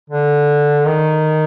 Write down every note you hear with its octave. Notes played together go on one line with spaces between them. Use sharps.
D3
D#3